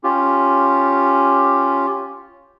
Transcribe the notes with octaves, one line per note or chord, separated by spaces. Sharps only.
C#4 F4 G4